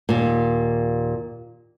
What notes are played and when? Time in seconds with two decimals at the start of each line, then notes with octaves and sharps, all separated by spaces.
0.09 D#2 A#2